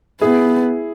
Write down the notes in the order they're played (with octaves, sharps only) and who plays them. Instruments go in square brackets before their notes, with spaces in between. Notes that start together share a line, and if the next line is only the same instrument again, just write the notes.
[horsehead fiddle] B3 [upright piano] E4 G#4